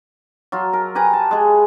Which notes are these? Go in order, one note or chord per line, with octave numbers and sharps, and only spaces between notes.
F#3 F4
A#4
G4 B4 G#5 A#5
A5
G#3 G#4